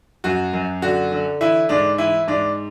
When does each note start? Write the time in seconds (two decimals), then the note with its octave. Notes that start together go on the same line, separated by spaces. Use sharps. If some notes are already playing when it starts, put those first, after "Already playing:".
0.24 F#2 F#4
0.53 F#2
0.82 D3 F#4
1.12 D3
1.41 E3 E4
1.69 G#2 D4
1.98 E3 E4
2.28 G#2 D4